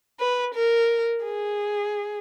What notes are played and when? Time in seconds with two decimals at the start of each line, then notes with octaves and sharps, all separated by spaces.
0.20 B4
0.54 A#4
1.24 G#4